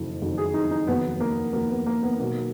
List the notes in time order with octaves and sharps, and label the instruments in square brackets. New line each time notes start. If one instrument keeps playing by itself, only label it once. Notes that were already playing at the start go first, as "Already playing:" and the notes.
Already playing: [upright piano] F#1 F2 D#3 F#3
F#1 F2 D#3 F#3
G#4
D#4
D#4
F1 D#2 D#3 F#3 B3
A#3
F1 D#2 D#3 F#3 A#3
B3
A#3
B3
B1 B2 F#3 A#3